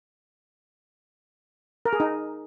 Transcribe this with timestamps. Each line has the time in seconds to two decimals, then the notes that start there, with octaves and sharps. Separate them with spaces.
1.85 A#4
1.93 G#4
2.00 D#4